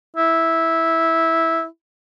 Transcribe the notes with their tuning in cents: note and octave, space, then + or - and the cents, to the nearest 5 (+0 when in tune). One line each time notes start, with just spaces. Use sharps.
E4 -10